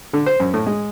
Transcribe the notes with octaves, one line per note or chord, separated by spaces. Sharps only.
D3
C5
F#2
A2
G#3